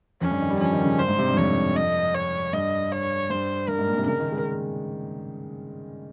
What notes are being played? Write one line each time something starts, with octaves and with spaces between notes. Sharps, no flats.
F2 C#4
G2
D#3
G3
F3 C#4
D#3
C#3
G2 C5
G#2
C3
G2
F2 C#5
D#5
C#5
G2 D#5
C#5
G2 C5
G2 A#4
G#2
A#2
C3
C#3 A#4
D#3
G#3